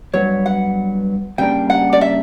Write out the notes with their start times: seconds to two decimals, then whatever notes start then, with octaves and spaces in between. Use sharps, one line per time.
0.13 G2 F#3 B3 C#5
0.46 F#5
1.38 C#3 G3 A#3 D4 A#4 G5
1.70 F#5
1.93 D5
2.01 E5